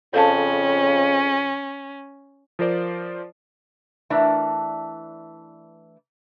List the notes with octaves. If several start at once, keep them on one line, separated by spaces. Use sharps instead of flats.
F2 C#3 C#4 A4 F5 A5
F3 F4 A#4 C5 D5
E3 A3 D4 A#4 D5 E5